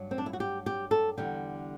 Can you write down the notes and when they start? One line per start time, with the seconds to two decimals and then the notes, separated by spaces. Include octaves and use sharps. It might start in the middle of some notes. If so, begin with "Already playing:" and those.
Already playing: G2 F#3
0.11 C4
0.18 D4
0.26 E4
0.33 F#4
0.40 G4
0.66 G4
0.91 A4
1.17 E2 D3 G3 G4